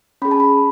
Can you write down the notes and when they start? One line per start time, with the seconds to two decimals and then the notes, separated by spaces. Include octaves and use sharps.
0.22 C#4 G#4 B5
0.31 A5
0.40 B5